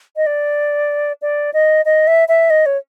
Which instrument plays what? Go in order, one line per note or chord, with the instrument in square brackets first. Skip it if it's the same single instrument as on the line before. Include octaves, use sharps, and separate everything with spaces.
[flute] D#5
D5
D5
D#5
D#5
E5
E5
D#5
C#5